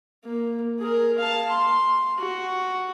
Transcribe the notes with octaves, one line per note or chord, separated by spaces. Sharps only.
A#3
G#4 A#4
F5 A5
C6
F#4